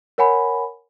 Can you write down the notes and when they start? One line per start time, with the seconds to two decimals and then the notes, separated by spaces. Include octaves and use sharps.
0.18 A#4 C#5 F#5 G#5 B5